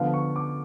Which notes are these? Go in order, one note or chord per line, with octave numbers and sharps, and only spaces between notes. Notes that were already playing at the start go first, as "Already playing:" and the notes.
Already playing: D3 F3 B3 F5
C#6
D6